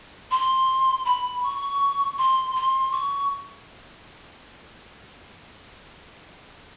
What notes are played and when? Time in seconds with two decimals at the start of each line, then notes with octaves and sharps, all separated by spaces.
0.31 C6
1.05 B5
1.43 C#6
2.18 C6
2.55 C6
2.92 C#6